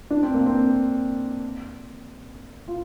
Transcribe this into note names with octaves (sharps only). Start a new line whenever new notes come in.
D4
C4
A#3
C4
F4